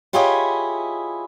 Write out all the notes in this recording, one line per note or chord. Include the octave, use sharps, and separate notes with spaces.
E4 F4 G4 G#4 C#5 D#5